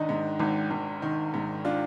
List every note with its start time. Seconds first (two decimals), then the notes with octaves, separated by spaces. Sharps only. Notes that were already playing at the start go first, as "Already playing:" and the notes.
Already playing: G#1 D#3 D4 D#4
0.09 G#2
0.40 G#1
0.71 G#1
1.02 D#3
1.34 G#2
1.65 D4 F4